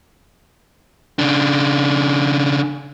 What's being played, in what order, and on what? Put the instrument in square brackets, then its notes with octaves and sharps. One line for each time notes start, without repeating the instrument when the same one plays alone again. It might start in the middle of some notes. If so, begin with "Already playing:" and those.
[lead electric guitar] C#3 D4